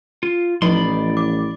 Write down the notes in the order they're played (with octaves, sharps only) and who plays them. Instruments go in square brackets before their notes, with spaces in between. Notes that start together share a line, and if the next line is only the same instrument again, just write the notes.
[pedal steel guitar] F4
[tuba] A1 [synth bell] F3 E4 D#5 [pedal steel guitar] D5 B5 C6
[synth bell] D6